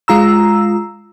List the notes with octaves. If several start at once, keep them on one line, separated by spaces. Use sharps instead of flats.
G#3 F4 A#5 E6